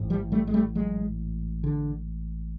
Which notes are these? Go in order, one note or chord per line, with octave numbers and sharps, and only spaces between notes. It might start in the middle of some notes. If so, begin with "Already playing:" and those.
Already playing: A1 G#2
F3 G3
G3 A3
G#3
G3 A3
F#3 G#3
D3